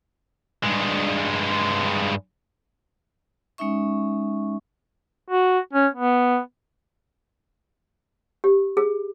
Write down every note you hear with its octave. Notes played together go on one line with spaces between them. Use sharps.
G2 G#3
G#3 C#4 D#4 E5 C#6
F#4
C#4
B3
G4
G#4